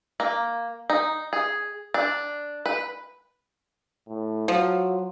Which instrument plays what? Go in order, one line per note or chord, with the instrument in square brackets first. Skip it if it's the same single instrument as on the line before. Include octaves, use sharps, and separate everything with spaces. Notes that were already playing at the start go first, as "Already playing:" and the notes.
[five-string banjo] A#3
D#4
G#4
D4
B4
[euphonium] A2
[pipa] F3 [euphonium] F#3